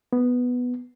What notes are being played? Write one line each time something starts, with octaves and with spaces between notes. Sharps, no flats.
B3